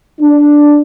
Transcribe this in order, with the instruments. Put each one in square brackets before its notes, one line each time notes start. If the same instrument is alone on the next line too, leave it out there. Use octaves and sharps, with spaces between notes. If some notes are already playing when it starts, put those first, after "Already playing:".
[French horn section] D4